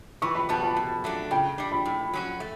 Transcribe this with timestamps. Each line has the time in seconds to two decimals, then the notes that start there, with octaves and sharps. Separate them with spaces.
0.22 E3 C#6
0.35 B5
0.49 G3 B3 F#4 A5
0.63 A5
0.77 B2
1.04 F#3 A3 D4
1.31 C#3 G5
1.58 G3 D4
1.72 B5
1.85 A2
2.13 F#3 C#4 F#4
2.40 A3